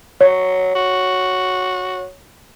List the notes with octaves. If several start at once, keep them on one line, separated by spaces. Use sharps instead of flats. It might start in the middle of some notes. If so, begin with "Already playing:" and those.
F#3 C#5
F#4